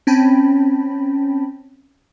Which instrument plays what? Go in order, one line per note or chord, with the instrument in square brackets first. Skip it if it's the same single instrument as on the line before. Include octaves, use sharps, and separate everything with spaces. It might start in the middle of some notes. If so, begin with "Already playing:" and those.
[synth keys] C4 C#4 G5 A5 B5